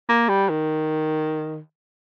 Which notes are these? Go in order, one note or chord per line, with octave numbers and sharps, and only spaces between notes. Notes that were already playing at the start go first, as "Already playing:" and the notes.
A#3
G3
D#3